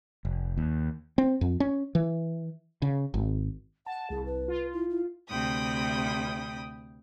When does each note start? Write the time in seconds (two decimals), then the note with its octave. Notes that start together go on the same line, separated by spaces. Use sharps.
0.25 F1
0.57 D#2
1.18 C4
1.41 F2
1.60 C#4
1.95 E3
2.82 C#3
3.14 G#1
3.86 F#5 A5
4.10 C2 G#4
4.26 B4
4.48 F4
4.73 E4
4.90 E4
5.28 D2 C3 G5 B5 D#6